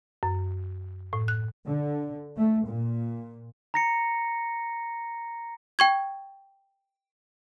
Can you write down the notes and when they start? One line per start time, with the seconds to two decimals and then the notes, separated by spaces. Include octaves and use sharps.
0.23 F#2
1.13 A2
1.28 F#6
1.66 D3
2.36 A3
2.67 A#2
3.74 A#5 A#6 C#7
5.79 G5 C#6 G#6